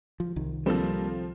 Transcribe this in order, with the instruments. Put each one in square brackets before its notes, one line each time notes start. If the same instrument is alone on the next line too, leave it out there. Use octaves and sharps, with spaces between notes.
[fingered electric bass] F3
C2 D#3
[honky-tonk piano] F3 C4 [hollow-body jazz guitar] G3 A#3 A4